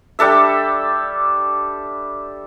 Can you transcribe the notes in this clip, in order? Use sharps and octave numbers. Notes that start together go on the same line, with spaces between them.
G3 D4 A4 E5